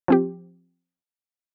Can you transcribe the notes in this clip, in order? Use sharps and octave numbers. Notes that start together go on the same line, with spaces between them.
F3 C4 G4